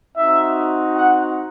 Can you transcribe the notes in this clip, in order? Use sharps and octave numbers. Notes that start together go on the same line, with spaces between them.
C4 D#4 F#4 E5
F#5